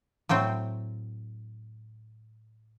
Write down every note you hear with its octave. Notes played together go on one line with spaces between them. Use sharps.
A2 F#3 C4 G5